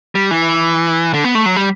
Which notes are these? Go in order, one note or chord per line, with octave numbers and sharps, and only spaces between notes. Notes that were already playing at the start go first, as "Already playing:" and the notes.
G3
E3
D3
B3
A3
F#3
G3